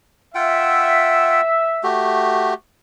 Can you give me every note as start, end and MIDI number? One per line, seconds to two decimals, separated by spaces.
0.35 1.41 65
0.35 1.91 76
0.35 1.41 78
0.35 1.41 79
1.83 2.54 57
1.83 2.54 66
1.83 2.54 67